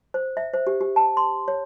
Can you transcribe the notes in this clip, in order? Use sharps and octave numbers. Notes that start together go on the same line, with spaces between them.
C5
E5
C5
G4
G4
A5
C6
C#5